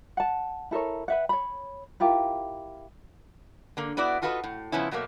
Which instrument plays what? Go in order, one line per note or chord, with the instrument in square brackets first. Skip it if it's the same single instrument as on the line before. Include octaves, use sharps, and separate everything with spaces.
[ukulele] F#5 A5
E4 A4 A#4 C#5
B4 E5 F#5
C#5 B5
E4 F4 G4 A#4
[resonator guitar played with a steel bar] D3 A#3
B3 E4 F#4 D5
D4 F4 F#4 A4 B4 D#5
A2
C#3 F3 B3 C#4 E4
B2 F#3 A3 A#3